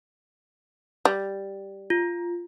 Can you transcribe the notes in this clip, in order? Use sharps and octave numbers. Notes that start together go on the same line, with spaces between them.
G3
F4